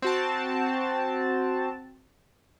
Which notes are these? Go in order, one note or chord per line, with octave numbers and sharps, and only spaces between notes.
C4 F#4 A5